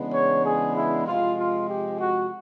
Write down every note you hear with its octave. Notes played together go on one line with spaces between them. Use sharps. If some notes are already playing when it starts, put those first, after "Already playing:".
Already playing: C#3 E3 G#3 B3 D4
C#5
G#4
E4
C3 F3 G#3 F4
F4
G4
F#4